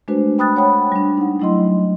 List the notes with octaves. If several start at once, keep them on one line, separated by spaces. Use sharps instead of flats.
G#3 A3 D4 F#4 B4 C5
G5 B5 D#6 F#6 A6
C#5 F#5 G5 B5 D#6
G3 D4
D#4 F#5
F#3 A3 E4 D#5 C6